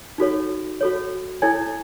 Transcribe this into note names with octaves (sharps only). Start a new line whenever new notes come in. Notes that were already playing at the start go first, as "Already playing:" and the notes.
D#4 F#4 A4 C#5
F#4 A4 C#5
E4 A4 C#5 G#5 G#6